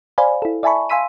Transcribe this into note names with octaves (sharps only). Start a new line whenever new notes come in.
C5 D5 F5 G#5 B5
E4 A4
D5 E5 G#5 A5 B5 C#6
F5 G#5 C6 E6 B6 D#7